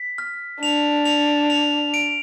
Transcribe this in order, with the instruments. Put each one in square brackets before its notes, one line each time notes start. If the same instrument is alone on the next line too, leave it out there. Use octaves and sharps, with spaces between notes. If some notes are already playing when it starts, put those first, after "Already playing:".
Already playing: [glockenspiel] B6
F6
[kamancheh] D4 [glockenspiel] F7
[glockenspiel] F7
F7
D7